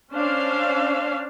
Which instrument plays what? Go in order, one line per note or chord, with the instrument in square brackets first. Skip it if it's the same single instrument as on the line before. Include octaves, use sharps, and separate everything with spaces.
[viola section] C#4 D4 C5 F5